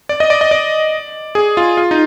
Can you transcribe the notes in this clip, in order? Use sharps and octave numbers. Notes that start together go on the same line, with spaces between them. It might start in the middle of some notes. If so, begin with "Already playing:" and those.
D5
D#5
D5
D#5
D5
G#4
F4
F4
D#4